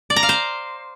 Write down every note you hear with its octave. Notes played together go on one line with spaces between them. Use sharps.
D5
A#5
F5
C5